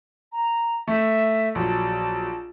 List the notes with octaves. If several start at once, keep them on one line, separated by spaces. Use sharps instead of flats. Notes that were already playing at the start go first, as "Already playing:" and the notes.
A#5
A3 E5
A#1 F#3 A5